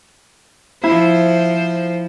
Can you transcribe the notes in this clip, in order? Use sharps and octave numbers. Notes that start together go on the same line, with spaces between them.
F3 E4 C5